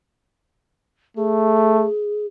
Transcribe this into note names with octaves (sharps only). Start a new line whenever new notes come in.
A3 G#4